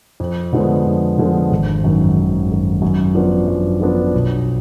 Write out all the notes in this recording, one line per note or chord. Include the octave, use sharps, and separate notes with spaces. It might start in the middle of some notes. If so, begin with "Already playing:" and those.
F2
D3 F3 G#3 B3
F2
D3 F3 G#3 B3
G#1
F#2 D#3
G#1
F#2 D#3
F#2
F3 B3 D4 F4
F#2
F3 B3 D4 F4
B1